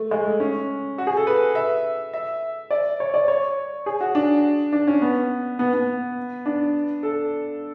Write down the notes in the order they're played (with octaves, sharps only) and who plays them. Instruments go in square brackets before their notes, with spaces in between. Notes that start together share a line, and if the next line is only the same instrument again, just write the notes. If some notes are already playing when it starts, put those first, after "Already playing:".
Already playing: [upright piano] A3
G#3
A3
C#4
F#4
G#4
A4
B4
E5
E5
D5
C#5
D5
C#5
G#4
F#4
D4
D4
C#4
B3
B3
B3
D4
A4